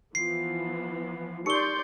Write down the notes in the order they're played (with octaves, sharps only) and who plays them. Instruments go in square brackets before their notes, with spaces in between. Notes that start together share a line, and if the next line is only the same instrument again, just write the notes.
[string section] E3 F3 B3 [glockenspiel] C7
[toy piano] D#4 G4 A#4 [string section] D5 C6 G6 [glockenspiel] C#7 G7